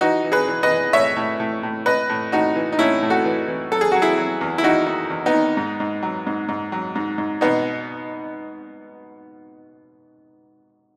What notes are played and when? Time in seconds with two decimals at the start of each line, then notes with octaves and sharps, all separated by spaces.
0.01 E3 D#4 F#4
0.24 E3
0.32 G#4 B4
0.48 E3
0.63 B4 D#5
0.71 E3
0.93 A2 C#5 E5
1.16 A2
1.40 A2
1.63 A2
1.86 A2 B4 D#5
2.09 A2
2.32 A2 D#4 F#4
2.56 E3
2.72 D#4
2.78 A2 C#4 E4
3.02 A2
3.10 F#4 A4
3.25 E3
3.48 E3
3.72 F#3 A4
3.81 G#4
3.92 F#3 F#4
4.02 E4 G#4
4.17 F#3
4.41 E2
4.58 E4
4.63 D#3 D#4 F#4
4.87 D#3
5.10 E2
5.26 B3 D#4
5.33 D#3
5.57 G#2
5.80 G#2
6.03 F#3
6.27 G#2
6.48 G#2
6.72 F#3
6.95 G#2
7.18 G#2
7.41 B2 B3 D#4